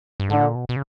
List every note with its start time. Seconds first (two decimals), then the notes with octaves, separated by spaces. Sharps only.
0.20 G2
0.29 G#2 D3
0.36 A2
0.42 A#2
0.55 B2
0.69 B2
0.76 C#3